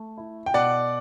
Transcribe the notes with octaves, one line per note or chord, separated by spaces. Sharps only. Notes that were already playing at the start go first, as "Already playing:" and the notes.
Already playing: A3
E4
G5
B2 D5 F#5